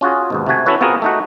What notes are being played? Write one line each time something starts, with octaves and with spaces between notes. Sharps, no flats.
C#4 F4 F#4 G#4
D#2 G#2 B2
C3 A3 F#4 G#5
C#4 E4 F#4 A4 B4 C#5
B3 C4 F4 F#4 G#4 A#4
A3 D#4 F#4